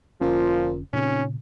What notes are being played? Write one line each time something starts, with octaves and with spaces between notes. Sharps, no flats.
F1 A#2 D3 F3 C#4
F1 A#2 C#3 C#4